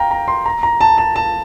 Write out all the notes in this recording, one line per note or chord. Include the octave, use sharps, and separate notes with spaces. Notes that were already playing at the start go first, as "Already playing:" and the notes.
Already playing: F5 G5 A#5
A#5
C6
A#5
A#5
A5
A5
A5